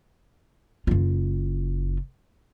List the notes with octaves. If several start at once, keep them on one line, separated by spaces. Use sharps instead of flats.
F#1 F4